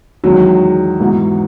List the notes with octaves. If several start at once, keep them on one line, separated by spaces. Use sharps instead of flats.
E2 D#3 F#3 G#3
G#2 E3 B3 F#4